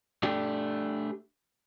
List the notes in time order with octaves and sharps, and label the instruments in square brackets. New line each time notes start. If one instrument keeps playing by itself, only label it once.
[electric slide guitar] A3 D4 G4